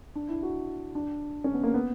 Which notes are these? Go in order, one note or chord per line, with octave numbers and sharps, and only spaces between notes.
D4
E4
F#4
D4
C#4
B3
A#3
B3